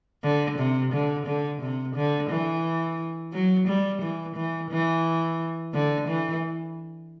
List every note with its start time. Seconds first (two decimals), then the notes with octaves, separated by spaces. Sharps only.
0.24 D3
0.58 C3
0.93 D3
1.26 D3
1.61 C3
1.95 D3
2.30 E3
3.33 F#3
3.67 G3
4.02 E3
4.36 E3
4.70 E3
5.74 D3
6.08 E3